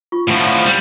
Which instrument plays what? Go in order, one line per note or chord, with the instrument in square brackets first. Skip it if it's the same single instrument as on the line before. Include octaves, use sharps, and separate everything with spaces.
[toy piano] F4 C#6
[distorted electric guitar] A2 F3 [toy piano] F#5
[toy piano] D5 F#5
[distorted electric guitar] G3